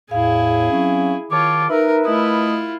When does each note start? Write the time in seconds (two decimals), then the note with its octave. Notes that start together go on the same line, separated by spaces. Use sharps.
0.11 E2 A2 E4 G#4 F5
0.71 F#3 C4 C#4
1.32 D#3 F4 C#5 A5 D6
1.70 D#4 A#4 B4 E5 A#5
2.05 A3 E4 F4 D#5 D#6